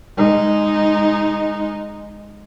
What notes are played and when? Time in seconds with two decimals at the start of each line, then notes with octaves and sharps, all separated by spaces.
0.17 G#3 D#4